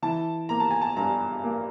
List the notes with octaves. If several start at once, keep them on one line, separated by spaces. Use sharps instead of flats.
E3 A5
A#3 A#5
A5
G#5
A5
G2 A#5
A#3